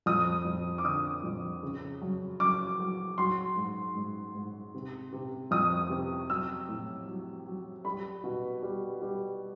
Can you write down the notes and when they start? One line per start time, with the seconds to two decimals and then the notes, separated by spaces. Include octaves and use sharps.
0.06 F2 D#6
0.45 F2
0.78 D6
0.84 D3 D#6
1.24 F2
1.63 C#3
2.02 F#2
2.40 F#2 D6
2.80 F#3
3.18 F#3 C6
3.56 G#2
3.95 G#2
4.35 G#2
4.74 C3
5.13 C3
5.51 F2 D#6
5.90 C3
6.30 F#3 E6
6.69 A2
7.08 F#3
7.46 F#3
7.85 G3 B5
8.24 B2
8.63 G3
9.02 G3